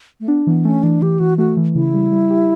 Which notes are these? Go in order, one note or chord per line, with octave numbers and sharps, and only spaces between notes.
A3
B3 D4
E3 B3
A3 C#4
E3 D4
E3 G4
E3 F#4
A3 F#4
E3
C#3 E4
G3
G3
G4